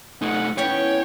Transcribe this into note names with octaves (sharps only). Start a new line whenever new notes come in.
G1 A3 D#4 F#5
E3 B3 C#4 C#5 G5